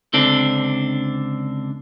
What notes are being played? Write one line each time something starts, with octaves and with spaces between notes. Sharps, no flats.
C#2 D3 C4 D4